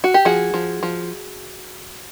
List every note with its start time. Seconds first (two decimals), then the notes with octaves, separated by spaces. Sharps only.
0.04 F#4
0.14 G4
0.25 F3 F#4 G#4
0.54 F3
0.83 F3